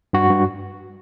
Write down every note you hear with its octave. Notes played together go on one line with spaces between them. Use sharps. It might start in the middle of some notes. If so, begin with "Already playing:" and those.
G2 F#4
G2